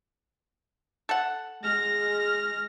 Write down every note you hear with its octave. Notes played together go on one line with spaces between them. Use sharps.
A4 F#5
G#3 F6 A#6